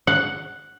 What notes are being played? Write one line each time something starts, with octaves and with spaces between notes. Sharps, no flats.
F#5